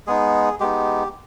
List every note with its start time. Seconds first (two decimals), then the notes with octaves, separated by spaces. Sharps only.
0.07 G#3 B3 D#4 G#4
0.60 G#3 B3 D#4 G4